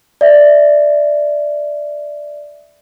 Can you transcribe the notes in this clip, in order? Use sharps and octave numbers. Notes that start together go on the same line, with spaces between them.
D5 E5